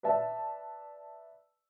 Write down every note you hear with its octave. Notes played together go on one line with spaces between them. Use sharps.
B4 D5 E5 A5